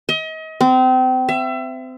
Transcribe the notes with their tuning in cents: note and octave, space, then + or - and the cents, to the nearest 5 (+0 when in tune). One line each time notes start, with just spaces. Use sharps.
D#5 +35
C4 -30
E5 +30